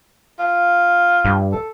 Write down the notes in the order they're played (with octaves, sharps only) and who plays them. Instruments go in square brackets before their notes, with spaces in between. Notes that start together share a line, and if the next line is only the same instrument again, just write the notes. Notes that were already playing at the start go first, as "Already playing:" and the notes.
[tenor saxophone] F4
[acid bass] G2
[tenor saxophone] A4